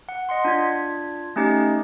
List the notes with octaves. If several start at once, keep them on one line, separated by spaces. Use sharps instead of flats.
F#5
D#5 F#5 C6
D4 F4 G#6
A3 C#4 D#4 G4 D#5